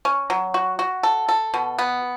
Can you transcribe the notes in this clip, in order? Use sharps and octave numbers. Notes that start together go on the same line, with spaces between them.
C#4
F#3
F#4
F#4
A4
A4
B2
B3